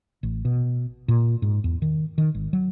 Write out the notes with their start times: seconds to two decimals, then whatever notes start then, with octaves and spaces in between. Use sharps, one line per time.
0.23 A1
0.45 B2
1.08 A#2
1.42 G#2
1.64 E2
1.82 D#3
2.18 D#3
2.35 G#1
2.53 F#3